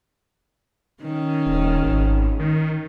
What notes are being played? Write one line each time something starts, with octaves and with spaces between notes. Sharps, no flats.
D#3 C#4
D#1
G#1
D#3